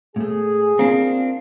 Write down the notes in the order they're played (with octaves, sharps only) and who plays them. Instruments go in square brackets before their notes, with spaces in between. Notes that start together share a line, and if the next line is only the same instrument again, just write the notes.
[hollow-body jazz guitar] A2 A3 [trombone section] G#4
[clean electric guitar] C4 D4 [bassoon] F4 [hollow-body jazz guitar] A#4